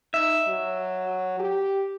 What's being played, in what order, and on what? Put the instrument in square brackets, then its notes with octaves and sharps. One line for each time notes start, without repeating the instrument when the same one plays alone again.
[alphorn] D#4 [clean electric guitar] E5
[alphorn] F#3
G4